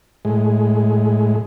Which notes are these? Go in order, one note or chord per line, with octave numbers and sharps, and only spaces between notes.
A2 G#3